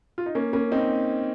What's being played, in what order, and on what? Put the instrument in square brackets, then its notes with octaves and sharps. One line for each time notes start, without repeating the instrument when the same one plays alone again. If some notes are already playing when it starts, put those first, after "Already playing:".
[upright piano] F4
D#4
A#3 C#4
A#3 C#4
C4 D#4